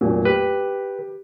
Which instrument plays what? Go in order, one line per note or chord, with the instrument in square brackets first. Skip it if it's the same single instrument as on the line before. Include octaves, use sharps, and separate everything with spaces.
[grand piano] F1 A#2 F#3
[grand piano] G4 [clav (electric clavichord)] B4